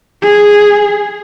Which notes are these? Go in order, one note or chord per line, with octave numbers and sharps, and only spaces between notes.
G#4